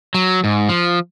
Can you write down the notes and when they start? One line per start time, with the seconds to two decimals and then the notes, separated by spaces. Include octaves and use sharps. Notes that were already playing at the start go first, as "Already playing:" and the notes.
0.14 F#3
0.44 G#2
0.69 F3